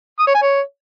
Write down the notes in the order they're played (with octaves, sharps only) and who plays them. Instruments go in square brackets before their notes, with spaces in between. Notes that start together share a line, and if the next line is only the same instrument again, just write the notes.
[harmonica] D#6
C#5
G#5
C#5